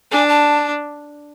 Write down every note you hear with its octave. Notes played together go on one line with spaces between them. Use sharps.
D4 G#5
A5